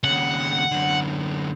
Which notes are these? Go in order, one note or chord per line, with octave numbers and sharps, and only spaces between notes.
D#2 C#3 F#5
F#2 D3